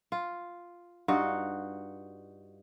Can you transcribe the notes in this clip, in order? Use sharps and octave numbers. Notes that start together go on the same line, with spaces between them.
F4
G2 D#4 F4 F#4